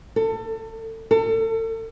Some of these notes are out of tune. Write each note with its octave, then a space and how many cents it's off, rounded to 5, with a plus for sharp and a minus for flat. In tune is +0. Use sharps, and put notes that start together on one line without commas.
A4 +30
A4 +35